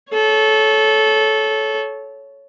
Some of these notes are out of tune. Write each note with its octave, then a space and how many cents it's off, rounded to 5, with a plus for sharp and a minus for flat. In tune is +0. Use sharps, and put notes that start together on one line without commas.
A4 -20 C#5 +0